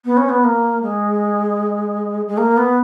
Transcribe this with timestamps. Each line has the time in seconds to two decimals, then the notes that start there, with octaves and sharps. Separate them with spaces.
0.05 B3
0.17 C#4
0.29 B3
0.44 A#3
0.82 G#3
2.28 G#3
2.37 A#3
2.57 B3